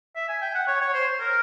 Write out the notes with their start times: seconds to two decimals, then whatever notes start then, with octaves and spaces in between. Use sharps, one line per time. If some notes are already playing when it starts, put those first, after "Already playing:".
0.16 E5
0.29 G#5
0.42 G5
0.55 F#5
0.67 C#5
0.81 C#5
0.94 C5
1.20 A#4